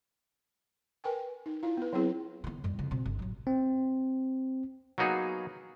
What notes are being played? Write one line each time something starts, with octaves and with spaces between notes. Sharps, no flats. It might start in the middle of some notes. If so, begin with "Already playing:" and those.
A#4 B4 G5 G#5
D#4
E4 F4 F5
B3 B4
F#3 B3 C4 E4 G#4
D#3 B3
F#2 G3
F2 C#3
B2 C4
G1
A1 F#3
C4
F#3 A#3 B3 D#4 F#4 G#4